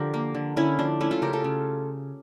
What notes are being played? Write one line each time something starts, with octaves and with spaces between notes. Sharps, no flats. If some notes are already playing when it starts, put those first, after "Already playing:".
Already playing: D3 F3 F4 G4 A#4
A#3
D3
D3 C#4 E4
F3 D4
A3 C#4 E4
F4 A4
C#3 G4 A#4
F4 A4
C#3